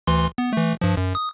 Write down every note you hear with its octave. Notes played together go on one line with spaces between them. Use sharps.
D2 E3 C6
B3
E3 A3
G2 F3
F#2
D#6